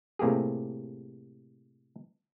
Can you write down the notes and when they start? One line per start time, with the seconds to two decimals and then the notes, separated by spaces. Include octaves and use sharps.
0.19 A2 C3 A#3 G4 G#4